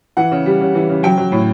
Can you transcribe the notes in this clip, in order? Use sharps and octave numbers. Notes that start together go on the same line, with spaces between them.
E3 F#5
C#3
G3
C#3
E3
C#3
F#3 G5
F#3
A2